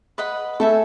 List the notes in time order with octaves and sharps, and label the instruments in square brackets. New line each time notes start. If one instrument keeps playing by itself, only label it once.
[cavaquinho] B4 D#5 F#5 B5
[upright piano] A3 [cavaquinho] A4 E5 G#5